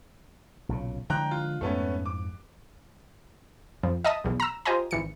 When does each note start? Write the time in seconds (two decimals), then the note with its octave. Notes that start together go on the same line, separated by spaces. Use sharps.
0.69 B1 A#2 C#3
1.10 D3 F3 G#3 G5 A#5 F#6
1.31 F4
1.61 F2 G#2 A3 B3 C#4
2.06 D6
3.83 F2
4.05 D#5 E5 A5 D#6
4.24 B1 E2 B2
4.40 A#5 E6
4.65 F4 G4 C5 D#5 G#5 A#5
4.91 G#1 E3 C#7